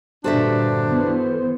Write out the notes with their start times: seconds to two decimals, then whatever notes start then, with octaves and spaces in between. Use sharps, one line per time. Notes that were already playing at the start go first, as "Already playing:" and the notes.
0.24 G2 A#2 D3 D4 F#4 A4 C5 E5
0.92 E3 B3